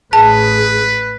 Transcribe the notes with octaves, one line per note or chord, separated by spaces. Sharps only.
A1 A2 G#4 B4 A5